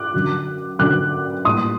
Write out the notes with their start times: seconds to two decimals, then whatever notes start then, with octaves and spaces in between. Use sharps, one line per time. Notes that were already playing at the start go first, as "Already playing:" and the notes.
Already playing: D6 F#6
0.14 F#2 D3 F#3
0.79 F#2 D3 F#3 D6 F#6
1.45 A2 G3 A#3 C6 D#6